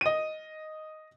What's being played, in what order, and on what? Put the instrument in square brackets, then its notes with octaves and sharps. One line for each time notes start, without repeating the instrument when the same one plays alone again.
[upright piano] D#5 D#7